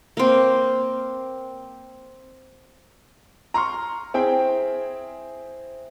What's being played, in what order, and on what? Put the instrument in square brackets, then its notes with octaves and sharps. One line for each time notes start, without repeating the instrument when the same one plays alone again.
[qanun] A#3 C4
[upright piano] A#5 C6 C#6 F6
C4 E4 G#4 E5 G5